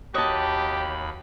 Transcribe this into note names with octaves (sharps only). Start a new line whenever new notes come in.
D#2 F#4 G4 B4 C#5 D#5 A5 B5